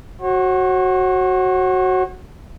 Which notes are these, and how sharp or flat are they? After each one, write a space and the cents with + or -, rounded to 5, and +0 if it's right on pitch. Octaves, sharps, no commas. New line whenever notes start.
F#4 +5 C#5 -45